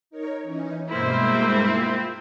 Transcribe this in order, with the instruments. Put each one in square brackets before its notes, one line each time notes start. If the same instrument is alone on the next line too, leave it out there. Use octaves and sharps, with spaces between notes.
[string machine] D#4 A#4 C#5
E3 C#4 D#4
[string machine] G2 B2 G#3 [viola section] A#3 E4 C5 [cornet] C4
[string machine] F4